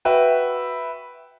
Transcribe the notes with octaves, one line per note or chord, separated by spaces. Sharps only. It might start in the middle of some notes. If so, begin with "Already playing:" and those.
F#4 B4 E5 G5